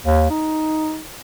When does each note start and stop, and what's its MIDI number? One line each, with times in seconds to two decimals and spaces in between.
0.06 0.26 39
0.30 1.01 63